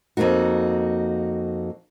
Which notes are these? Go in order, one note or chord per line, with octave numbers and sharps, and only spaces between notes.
F2 G#2 A#3 D#4 F#4